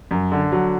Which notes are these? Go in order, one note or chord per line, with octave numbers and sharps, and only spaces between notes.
F#2
D3
F#3